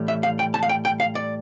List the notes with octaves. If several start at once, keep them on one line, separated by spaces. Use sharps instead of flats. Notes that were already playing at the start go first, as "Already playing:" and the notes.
Already playing: A2 E3 G3
E5
F5
G5
A5
F5
G5
G5
F5
D5